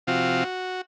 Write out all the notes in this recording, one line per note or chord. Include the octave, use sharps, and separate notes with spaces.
C3 F3 C4 F4 F#4